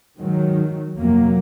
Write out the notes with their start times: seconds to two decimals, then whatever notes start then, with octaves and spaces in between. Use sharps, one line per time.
0.20 G#2 D#3 F#3
0.98 F2 C3 F#3 A#3